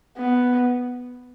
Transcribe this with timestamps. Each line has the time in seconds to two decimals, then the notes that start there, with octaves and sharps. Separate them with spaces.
0.18 B3